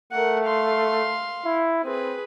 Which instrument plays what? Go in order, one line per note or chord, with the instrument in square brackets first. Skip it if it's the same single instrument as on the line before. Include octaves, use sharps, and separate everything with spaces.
[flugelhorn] A3 [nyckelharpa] A#4 F#5
[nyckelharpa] F5 C6
[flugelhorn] E4
[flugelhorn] C4 [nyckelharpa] G#4 B4